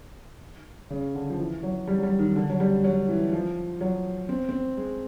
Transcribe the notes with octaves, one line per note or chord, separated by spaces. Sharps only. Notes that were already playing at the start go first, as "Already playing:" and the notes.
C#3
D3
F3
E3
F#3
G3
F#3
G3
D#3
D3
F#3
G3
F#3
E3
F3
F#3
C4
C4
G#3